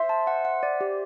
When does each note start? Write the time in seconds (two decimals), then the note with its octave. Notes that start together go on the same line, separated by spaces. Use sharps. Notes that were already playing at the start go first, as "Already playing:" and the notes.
Already playing: C5 E5
0.09 A5
0.27 F#5
0.45 F#5
0.63 D5
0.81 G4